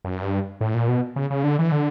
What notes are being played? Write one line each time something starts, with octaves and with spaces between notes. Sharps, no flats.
F#2
G2
A2
A#2
B2
C#3
C#3
D3
E3
D3